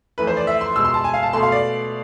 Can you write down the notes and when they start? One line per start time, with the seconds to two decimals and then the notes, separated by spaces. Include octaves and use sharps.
0.18 F2 E3 A3 B4
0.27 C5
0.37 D5
0.47 E5
0.61 C6
0.76 B2 G#3 E6
0.84 C6
0.94 A5
1.04 G#5
1.14 F5
1.23 A5
1.33 B2 A3 C6
1.43 F5
1.52 D5